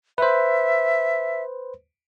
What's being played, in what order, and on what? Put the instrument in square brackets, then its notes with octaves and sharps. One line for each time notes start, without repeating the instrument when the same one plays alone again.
[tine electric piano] B4 C5 [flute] E5